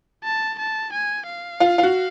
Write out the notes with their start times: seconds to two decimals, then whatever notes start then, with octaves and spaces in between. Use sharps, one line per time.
0.24 A5
0.59 A5
0.92 G#5
1.27 F5
1.60 F4
1.78 F4
1.83 F#4